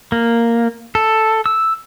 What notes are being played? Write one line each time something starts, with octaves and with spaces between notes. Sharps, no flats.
A#3
A4
E6